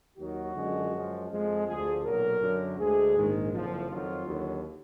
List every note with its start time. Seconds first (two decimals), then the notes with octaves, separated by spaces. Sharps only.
0.18 D#2 D#3 F#3 F#4
0.55 F#2 D3 F3 G#3
0.92 F#2 F3 G#3
1.30 F2 F3 G#3
1.67 D2 D3 F3 G#4
2.04 B1 A#2 F#3 A#4
2.41 F#2 D3 F#3
2.78 D2 D3 G#3 G#4
3.15 A#1 G#2 D#3 G#3
3.52 F#1 F2 F3
3.89 F2 D#3 F#3 F4
4.26 D#2 D3 F#3